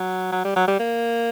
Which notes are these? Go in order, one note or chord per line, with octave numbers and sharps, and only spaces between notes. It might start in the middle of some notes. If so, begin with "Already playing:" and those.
Already playing: F#3
F#3
G3
F#3
G3
A#3